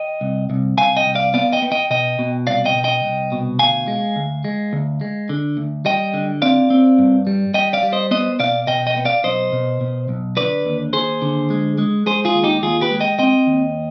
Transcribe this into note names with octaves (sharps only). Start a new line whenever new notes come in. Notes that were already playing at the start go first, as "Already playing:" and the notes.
Already playing: D#5 G5
C2
C2
C2 F5 G#5
D#5 G5
C2
D5 F5
B3 D5 F5
D#5 G5
B3
D#5 G5
B2 D#5 G5
B2
C2 D5 F5
D#5 G5
B2
D#5 G5
C2
B2
D2 F5 G#5
G#3
D2
G#3
D2
G#3
D3
D2
G3 D#5 G5
D3
C4 D5 F5
C4
G2
G3
G3 D#5 G5
D5 F5
G3
C5 D#5
B3 C5 D#5
B2 D5 F5
B2 D#5 G5
D#5 G5
B3
D5 F5
B1 C5 D#5
B2
B2
B1
D3 B4 D5
D#2
D#2 G#4 C5
D3
G#3
G#3
G#3 G#4 C5
F4 G#4
D#2
D#4 G4
D#2 F4 G#4
G4 B4
G#3
D#5 G5
C4 D#5 G5
D#2